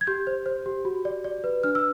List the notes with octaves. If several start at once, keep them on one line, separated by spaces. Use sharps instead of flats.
G#6
G4 G6
C5
C5
G4
F#4
D5
D5
B4
D4 F6
E6